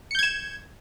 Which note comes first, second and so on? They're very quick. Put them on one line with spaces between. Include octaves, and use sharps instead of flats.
C#7 G6 G#6 E7